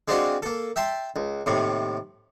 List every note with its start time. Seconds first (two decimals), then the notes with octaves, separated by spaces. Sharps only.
0.08 G#3 C4 D4 F4 F#4
0.42 A#3 A4
0.76 E5 G5 A5 C6
1.16 C#2
1.46 D#2 A2 C3